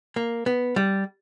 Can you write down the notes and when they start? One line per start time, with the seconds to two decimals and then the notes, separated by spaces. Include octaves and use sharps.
0.16 A#3
0.46 B3
0.76 G3